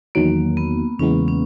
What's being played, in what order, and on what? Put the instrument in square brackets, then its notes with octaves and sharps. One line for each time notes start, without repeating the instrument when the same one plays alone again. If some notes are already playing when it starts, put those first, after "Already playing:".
[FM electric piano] E2 D#3 F#3 [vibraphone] A#3
[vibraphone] B3
[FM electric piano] E2 C#3 E3 G#3 B3 [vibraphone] C#4
[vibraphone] C#4